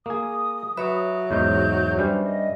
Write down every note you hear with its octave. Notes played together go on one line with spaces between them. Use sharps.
A#3 G#4 D#6
F#3 B4 C#5 E5
E2 G#2 D#4 G6
G2 G3 C#4 C5
D#5